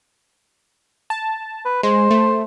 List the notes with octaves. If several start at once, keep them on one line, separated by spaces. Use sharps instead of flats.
A5
B4
G#3 C5
A3